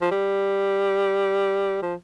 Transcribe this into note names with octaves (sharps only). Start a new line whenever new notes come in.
F3
G3
F3